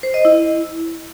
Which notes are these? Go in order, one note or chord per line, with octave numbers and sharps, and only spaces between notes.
C5
D#5
E4